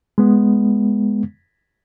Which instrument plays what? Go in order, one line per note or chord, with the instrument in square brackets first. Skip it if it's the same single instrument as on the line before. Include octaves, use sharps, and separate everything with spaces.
[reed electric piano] G#3 B3